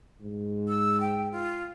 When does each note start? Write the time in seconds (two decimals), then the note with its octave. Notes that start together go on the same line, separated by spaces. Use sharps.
0.21 G#2
0.68 E6
1.00 G5
1.32 F4